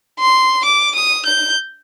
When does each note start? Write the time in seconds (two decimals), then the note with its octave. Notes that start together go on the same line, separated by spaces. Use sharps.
0.20 C6
0.65 D6
0.95 D#6
1.26 G6